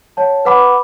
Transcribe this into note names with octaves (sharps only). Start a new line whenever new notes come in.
C#5 F#5 A5
B4 F#5 B5 D6